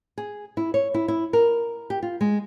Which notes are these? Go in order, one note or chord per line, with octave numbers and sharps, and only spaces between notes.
G#4
E4
C#5
E4
E4
A#4
G4
F4
G#3